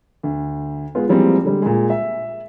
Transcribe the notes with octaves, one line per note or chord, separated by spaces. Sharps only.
D2
G#3 B3 F4
E3 F3 G3 G#3 A#3 C4
D3 G3 G#3
A#2 G#3
E5